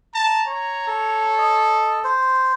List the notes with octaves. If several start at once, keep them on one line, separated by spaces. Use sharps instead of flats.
A5 A#5
C#5
A4 A#5
D#5
C5